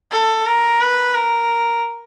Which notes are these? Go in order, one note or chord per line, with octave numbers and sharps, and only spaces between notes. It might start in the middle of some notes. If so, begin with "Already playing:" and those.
A4
A#4
B4
A#4